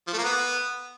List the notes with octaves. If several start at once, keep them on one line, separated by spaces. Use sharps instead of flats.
F3
A3
A#3
B3